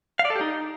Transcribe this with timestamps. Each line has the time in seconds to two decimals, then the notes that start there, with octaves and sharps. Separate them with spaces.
0.19 F5
0.25 D5
0.30 A4
0.36 G4
0.41 D#4